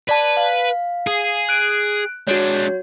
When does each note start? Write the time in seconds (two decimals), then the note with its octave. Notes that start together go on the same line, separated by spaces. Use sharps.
0.09 B4 D5 A5
0.37 F5
1.07 G#4
1.49 F#6 D7
2.27 G#3 D4 F#4 C#5